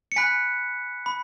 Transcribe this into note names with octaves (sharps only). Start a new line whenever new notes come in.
C#7
G#5 B5 F#6 B6
B5